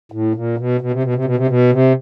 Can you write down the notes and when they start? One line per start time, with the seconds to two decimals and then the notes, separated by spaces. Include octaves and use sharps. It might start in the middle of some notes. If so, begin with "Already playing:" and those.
0.12 A2
0.35 A#2
0.58 B2
0.81 B2
0.92 C3
1.03 B2
1.14 C3
1.25 B2
1.36 C3
1.47 B2
1.72 C3